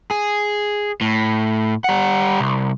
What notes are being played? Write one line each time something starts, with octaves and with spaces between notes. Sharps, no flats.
G#4
A2
G3 F#5
C2